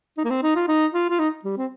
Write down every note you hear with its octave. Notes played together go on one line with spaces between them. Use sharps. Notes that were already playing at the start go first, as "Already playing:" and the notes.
D#4
A#3
C4
D#4
F4
D#4
F4
F4
D#4
G3
C4